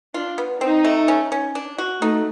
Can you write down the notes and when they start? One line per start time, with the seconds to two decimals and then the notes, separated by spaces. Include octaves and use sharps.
0.14 D4 F4
0.38 B3
0.61 C4 D#4
0.84 A3
1.08 C#4
1.32 C#4
1.55 D4
1.78 F#4
2.01 A3 D#4